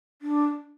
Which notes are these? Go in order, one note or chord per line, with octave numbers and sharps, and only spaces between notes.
D4